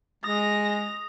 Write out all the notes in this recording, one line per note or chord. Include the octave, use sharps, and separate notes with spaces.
G#3 D#6 A#6